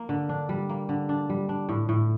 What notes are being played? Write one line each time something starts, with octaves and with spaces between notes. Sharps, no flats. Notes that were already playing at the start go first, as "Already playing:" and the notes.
Already playing: A#3
D3
D4
G3
A#3
D3
D4
G3
D4
A2
A2